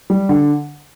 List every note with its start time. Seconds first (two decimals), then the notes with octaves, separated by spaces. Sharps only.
0.10 G3
0.29 D3